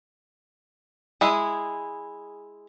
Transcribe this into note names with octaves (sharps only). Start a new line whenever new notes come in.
G#3 E4 G#4